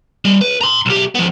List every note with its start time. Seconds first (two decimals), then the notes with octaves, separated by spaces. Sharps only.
0.25 G3
0.41 B4
0.61 A#5 C6
0.86 B1 G4
1.15 F3 B3